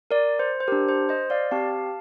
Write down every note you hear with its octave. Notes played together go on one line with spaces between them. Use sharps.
A#4 D5
C5
C5
D4 G4 A#4
C5
C5 D#5
D5 F5
C4 G4 F5 A5